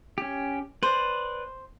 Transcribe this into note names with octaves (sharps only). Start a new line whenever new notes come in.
C#4 G4
B4 C5 D5